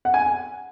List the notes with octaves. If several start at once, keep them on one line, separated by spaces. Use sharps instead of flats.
F#5
G#5